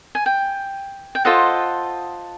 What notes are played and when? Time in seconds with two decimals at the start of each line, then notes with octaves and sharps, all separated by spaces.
0.15 G#5
0.26 G5
1.15 G5
1.25 F4 A4 C5 D#5 F#5